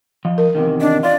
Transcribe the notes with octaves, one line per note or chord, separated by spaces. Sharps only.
F3 D#5
A#4
E2 C3 D#3
D4 D#5
F4 D5